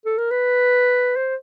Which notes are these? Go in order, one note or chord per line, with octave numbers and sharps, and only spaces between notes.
A4
A#4
B4
C5